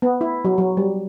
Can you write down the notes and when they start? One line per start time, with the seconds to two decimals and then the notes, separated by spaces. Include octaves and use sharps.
0.02 B3
0.21 E4
0.45 F#3
0.58 F#3
0.77 G3